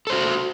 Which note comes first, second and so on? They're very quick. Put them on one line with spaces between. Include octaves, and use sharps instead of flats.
A4 C5 F#4